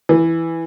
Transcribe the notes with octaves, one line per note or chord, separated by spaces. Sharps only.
E3